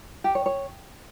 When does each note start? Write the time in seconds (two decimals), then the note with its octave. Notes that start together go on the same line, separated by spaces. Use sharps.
0.24 G4
0.35 C#5
0.46 C#5